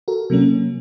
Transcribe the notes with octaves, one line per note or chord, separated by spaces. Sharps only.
F#4 A4 A#4
C3 F#3 A#3 C#4